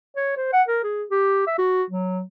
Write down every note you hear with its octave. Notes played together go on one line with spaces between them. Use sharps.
C#5
C5
F#5
A#4
G#4
G4
E5
F#4
F#3